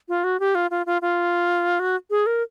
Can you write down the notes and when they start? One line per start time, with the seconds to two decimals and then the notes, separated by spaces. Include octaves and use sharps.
0.09 F4
0.24 F#4
0.40 G4
0.55 F4
0.71 F4
0.86 F4
1.02 F4
1.80 F#4
2.10 G#4
2.26 A#4